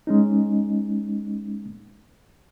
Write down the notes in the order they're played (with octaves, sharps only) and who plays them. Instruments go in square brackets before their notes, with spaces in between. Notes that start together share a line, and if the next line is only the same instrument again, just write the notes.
[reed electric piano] G#3 C#4 D#4